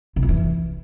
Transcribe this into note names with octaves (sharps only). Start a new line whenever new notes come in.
C3
F3
E3